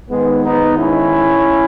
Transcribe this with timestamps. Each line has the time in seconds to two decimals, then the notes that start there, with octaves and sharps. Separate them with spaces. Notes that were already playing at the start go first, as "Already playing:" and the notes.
0.10 G#2 D#3 G#3 B3
0.44 B3 D#4
0.77 C#4 E4